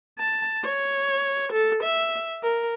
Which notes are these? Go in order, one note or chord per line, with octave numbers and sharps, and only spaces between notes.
A5
C#5
A4
E5
A#4